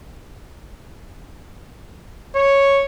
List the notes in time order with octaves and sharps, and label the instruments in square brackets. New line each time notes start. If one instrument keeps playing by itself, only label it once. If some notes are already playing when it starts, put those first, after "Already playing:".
[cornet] C#5